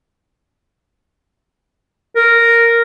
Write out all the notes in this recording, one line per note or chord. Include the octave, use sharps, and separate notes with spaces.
A#4